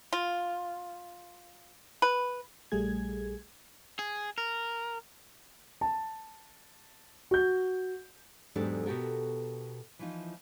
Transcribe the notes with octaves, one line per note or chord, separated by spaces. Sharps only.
F4
B4
A#1 G3 A3 G#4 G#6
G#4
A#4
A5
F#4 G6
E2 G#2 F#3 D4 G4 A4
B2 F#4 G4 A4 A#4
E3 F3 D#4